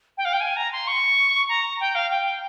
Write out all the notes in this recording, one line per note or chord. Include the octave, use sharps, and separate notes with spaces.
G5
F5
G5
G#5
A#5
C6
C#6
A#5
G5
F5
G5